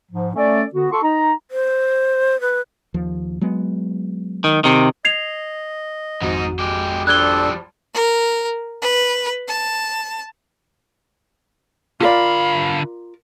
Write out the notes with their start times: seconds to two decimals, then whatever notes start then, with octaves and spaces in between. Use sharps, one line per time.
0.12 G#2 F3
0.35 A3 C#4 A4 D5
0.74 D3 B3 F#4
0.91 F4 A4 C6 C#6
1.03 D#4 A#5
1.51 C5
2.41 B4
2.94 D#2 F3
3.41 F#3 G#3 B3
4.44 D#3
4.64 C3 D#3
5.05 D#5 G#6 C7 F7
6.21 G#1 F2 G#2 D#4 F#4
6.59 G#3 G4
7.07 F3 G3 D4 A4 F#6 G#6 G7
7.94 A#4
8.81 B4
9.48 A5
12.00 D3 F4 A#4 D5 F5 B5